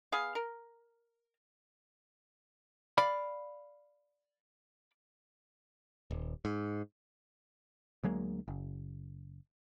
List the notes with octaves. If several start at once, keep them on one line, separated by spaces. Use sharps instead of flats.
B3 G#4 F5
A#4
D5 F5 B5
D#1
G#2
D2 F#3 G#3 A#3
F#1